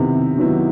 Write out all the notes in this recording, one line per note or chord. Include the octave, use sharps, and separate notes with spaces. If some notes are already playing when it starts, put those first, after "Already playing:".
Already playing: C3 D#3 B3 E4
D#3 F#3 B3 E4